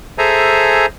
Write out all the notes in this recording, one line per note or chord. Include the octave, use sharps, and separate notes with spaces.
G#4 A4 C5 E5 G#5 A#5